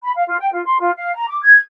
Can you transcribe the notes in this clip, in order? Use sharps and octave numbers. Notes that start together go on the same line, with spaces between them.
B5
F5
F4
G5
F4
C6
F4
F5
A#5
D6
G#6